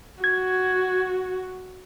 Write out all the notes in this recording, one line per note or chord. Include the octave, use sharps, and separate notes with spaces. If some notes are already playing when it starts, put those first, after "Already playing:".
F#4 G#6